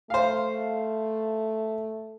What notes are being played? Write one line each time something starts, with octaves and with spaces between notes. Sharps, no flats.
A3 C5 F5